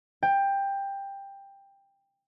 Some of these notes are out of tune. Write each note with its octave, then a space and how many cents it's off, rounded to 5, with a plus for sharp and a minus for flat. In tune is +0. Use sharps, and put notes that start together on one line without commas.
G5 +15